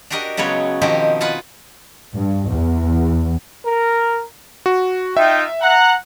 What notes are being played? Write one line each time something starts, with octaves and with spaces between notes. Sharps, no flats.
D4 F#4 G4 A#4 D#5
C#3 F#3 G#3 B3 C#5
B2 D#3 F3 C4 D#4 G4
F4 B4 F#5 G#5 A5
G2
E2
A#4
F#4
D#4 F4 E5 G5
F#5 A#5